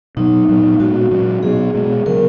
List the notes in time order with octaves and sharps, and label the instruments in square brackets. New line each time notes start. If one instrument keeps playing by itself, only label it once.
[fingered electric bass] B2 F#3 B3 [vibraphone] D#4
[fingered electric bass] A#2 F#3 B3
[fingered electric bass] A#2 G#3 B3 [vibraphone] F#4
[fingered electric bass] A#2 F#3 C#4
[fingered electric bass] B2 F#3 B3 [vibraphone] G#4
[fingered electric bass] B2 G#3 B3
[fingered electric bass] C#3 F#3 B3 [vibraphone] A#4